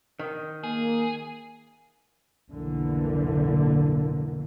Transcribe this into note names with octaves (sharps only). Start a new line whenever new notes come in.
D#3
A#3 G#4
F1 B1 A2 D3 E3 A#3